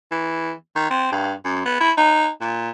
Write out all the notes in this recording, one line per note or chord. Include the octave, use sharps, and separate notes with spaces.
E3
D#3
C4
G2
F#2
B3
E4
D#4
A#2